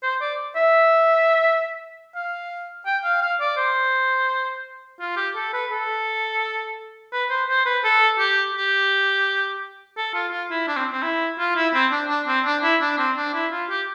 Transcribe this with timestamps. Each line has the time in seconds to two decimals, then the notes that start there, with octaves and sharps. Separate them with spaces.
0.03 C5
0.21 D5
0.56 E5
2.15 F5
2.86 G5
3.04 F5
3.22 F5
3.40 D5
3.57 C5
5.00 F4
5.17 G4
5.36 A4
5.53 B4
5.71 A4
7.12 B4
7.30 C5
7.49 C5
7.66 B4
7.84 A4
8.19 G4
8.55 G4
9.97 A4
10.14 F4
10.32 F4
10.51 E4
10.68 D4
10.76 C4
10.93 C4
11.03 E4
11.39 F4
11.56 E4
11.74 C4
11.92 D4
12.09 D4
12.27 C4
12.45 D4
12.63 E4
12.81 D4
12.98 C4
13.17 D4
13.34 E4
13.52 F4
13.70 G4